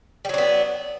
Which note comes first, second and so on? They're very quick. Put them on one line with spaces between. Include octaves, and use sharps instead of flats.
G3 F#3 D4 B3